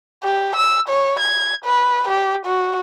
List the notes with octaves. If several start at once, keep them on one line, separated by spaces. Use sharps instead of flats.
G4
E6
C#5
G#6
B4
G4
F#4